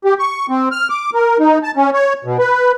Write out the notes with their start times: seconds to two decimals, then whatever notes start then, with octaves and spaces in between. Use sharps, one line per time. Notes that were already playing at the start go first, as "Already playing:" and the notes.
0.05 G4
0.19 C#6
0.49 C4
0.72 F6
0.90 D6
1.14 A#4
1.40 D#4
1.63 A5
1.77 C#4
1.93 C#5
2.25 B2
2.39 B4